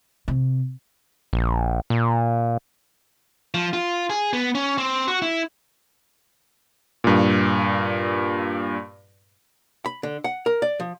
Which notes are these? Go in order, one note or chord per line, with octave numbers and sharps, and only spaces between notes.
C3
A#1
A#2
F3
F4
G#4
B3
C#4
C4
F#4
E4
G2 A#2
B5
D3
F#5
A#4
D5
F3